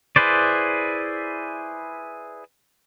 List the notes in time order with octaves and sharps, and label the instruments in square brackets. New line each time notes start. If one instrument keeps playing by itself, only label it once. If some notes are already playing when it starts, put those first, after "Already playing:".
[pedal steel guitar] E4 G#4 B4 C5 D5